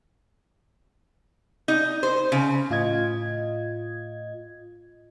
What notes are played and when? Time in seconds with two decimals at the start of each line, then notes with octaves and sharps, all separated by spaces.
1.68 D#4
2.03 C5
2.32 C#3
2.70 A2 F4 D#5 G#6